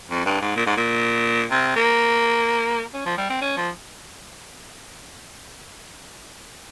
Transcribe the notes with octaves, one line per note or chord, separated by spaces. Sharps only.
F2
G2
G#2
A#2
G#2
A#2
C3
A#3
C#4
F3
G3
C4
C#4
F3